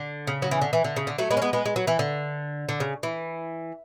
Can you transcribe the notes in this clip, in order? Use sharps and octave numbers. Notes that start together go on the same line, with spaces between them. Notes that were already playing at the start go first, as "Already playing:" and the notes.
Already playing: D3
C#3
F#3
E3
D3
E3
D3
C#3
D3
F#3 A3
G#3 B3
C#4
G#3 B3
G#3 B3
G#3
F#3
E3
D3
D3
C#3
E3